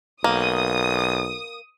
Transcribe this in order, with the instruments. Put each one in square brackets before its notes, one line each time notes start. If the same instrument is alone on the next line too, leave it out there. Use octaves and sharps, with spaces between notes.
[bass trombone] B1 [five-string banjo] A#3 [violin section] D#6